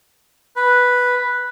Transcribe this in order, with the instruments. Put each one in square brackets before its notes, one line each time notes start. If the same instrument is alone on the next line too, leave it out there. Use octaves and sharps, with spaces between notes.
[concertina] B4